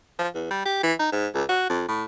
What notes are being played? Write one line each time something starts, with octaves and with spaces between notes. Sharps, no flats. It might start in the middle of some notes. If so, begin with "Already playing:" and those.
F3
E2
G3
G4
E3
D#4
G#2
C#2
F#4
F2
A2